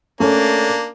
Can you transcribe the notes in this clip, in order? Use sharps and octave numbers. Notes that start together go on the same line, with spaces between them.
A3 A#3 C#4 D4